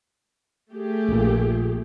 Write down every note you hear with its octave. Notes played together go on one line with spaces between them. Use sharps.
A3 G4 G#4
A#1 A#2